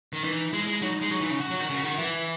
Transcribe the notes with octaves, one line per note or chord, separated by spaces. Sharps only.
D#3
E3 D#4
G#3 E4
G#3
F#3 D#4
G#3
F#3 D#4
E3
C#3
F#4
F#3
D#3
C#3
D#3
E3 E4